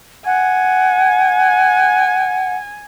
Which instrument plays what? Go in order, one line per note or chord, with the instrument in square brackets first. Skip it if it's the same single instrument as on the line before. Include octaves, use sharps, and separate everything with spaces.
[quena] F#5 [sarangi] G#5